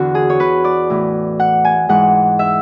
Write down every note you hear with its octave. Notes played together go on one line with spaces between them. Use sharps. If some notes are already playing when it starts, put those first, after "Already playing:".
Already playing: E2 D3 F#4
G#4
C#5
B4
D5
A2 E3
F#5
G#5
G#2 E3 F#5
E5